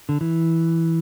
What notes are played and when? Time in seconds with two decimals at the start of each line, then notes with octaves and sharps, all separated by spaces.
0.09 D3
0.21 E3